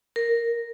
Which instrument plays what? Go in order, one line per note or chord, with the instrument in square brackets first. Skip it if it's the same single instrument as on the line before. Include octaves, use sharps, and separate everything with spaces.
[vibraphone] A#4